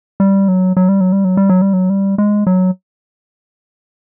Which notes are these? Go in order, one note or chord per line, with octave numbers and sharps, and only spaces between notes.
G3
F#3
F#3
G3
F#3
G3
F#3
G3
F#3
G3
F#3
G3
G#3
F#3